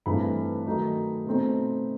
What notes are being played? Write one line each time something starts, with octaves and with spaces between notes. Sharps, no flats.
G2 E3 A3 C4 D#4 B5
D#3 F#3 A3 D#4
B2 A3 C4 D#4